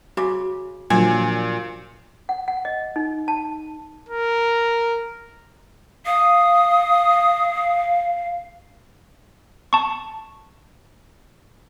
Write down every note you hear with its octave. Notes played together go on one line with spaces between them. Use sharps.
C#3 F#4 D6
A#2 D3 F3 F#3 G#5
F#5
F#5
D#5
D#4
A5
A#4
F5 D#6
A5 C#6